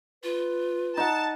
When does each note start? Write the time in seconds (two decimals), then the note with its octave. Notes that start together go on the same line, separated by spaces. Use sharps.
0.24 F4 B4
0.97 D#4 F#5 A5